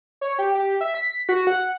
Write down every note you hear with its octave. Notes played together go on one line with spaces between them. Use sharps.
C#5
G4
G4
E5
B6
F#4
F#5